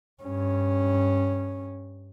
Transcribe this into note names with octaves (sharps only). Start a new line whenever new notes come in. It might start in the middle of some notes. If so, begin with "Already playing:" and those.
G2 C#4